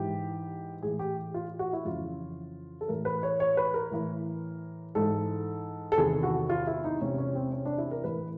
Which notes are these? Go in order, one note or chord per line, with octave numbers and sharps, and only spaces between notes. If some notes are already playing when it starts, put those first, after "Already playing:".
Already playing: G#2 E3 G4
A2 E3 G#4
G4
F4
F#4
E4
F2 C#3 E3 F4
A4
A2 E3 A#4
B4
C#5
C#5
B4
A#4
A2 E3
G#2 E3 A4
A4
E2 C3 D#3 G#4
F#4
F4
E4
D#4
E2 C3 E3 C#4
C#4
C4
C#4
D4
E4
A#4
A2 E3 B4